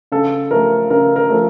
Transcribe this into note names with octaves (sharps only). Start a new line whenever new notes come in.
C#3 A4
F3 A3 A#4
C#3 A#4
A#4
F3 A3